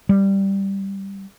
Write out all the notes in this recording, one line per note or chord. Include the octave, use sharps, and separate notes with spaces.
G3